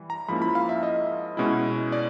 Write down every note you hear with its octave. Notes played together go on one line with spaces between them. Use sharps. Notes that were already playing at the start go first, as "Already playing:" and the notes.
Already playing: E3 G3
A#5
G#2 F3 A#3 C#4 E4 B5
B5
F5
E5
D#5
B2 G#3 C#4 E4
D5